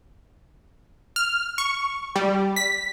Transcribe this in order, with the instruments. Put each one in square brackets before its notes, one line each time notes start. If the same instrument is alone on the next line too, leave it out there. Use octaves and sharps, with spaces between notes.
[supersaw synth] F6
C#6
G3
B6